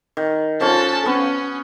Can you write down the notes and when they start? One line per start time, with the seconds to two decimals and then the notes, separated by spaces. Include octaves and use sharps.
0.17 D#3
0.61 F3 C#4 F#4 A4 A5
1.06 B3 C#4